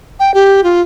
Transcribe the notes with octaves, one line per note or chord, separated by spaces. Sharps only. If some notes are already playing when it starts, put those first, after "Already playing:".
G5
G4
F4